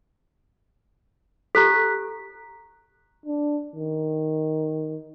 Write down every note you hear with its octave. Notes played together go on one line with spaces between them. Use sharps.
G4 A4 A#5 F#6 B6
D4
D#3